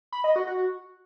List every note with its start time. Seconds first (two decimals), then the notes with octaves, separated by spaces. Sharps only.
0.13 B5
0.24 D#5
0.36 F#4
0.47 F#4